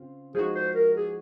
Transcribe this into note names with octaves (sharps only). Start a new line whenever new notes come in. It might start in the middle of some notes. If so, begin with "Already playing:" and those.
Already playing: C#3 C4 F4
F3 G#3 D#4 F#4 G#4
C5
A#4
G#4